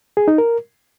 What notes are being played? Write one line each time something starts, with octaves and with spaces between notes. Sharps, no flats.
G#4
D#4
A#4